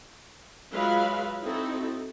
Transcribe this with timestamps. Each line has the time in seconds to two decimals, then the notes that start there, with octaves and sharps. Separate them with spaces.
0.73 F#3 G#3 F4 B4 E5 F5
1.44 C4 D#4 E4 F#4 A4